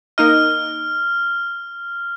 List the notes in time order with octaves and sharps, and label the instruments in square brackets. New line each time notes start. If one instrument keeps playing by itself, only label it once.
[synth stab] A#3 D#4 D#5 [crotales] F6